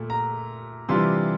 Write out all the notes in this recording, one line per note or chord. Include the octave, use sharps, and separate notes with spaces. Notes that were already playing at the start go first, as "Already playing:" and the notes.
Already playing: A#2 A3
A#5
C3 E3 G3 D4 F4 C6